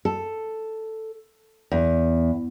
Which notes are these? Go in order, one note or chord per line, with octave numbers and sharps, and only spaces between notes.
A4
E2